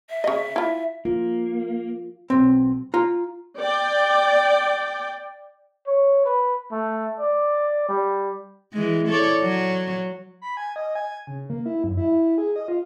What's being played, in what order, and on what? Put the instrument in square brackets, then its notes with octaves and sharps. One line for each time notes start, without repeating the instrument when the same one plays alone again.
[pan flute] E5
[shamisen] C#3 D#5
E4 F4
[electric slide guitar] A#3 [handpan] F4
[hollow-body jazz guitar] B1 C4
F4 A#5
[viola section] D5 G5
[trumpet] C#5
B4
A3
D5
G3
[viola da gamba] E3 G#3
A4 C#5 D5
F#3
[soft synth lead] B5
G#5
D#5
G#5
C#3
A#3
E4
F#2
E4
G#4
D#5
F4